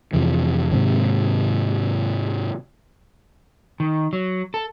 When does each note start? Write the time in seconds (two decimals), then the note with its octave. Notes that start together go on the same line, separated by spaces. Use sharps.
0.13 F2 C3 E3
0.71 G#2 C3 D#3
3.80 D#3
4.13 F#3
4.54 A4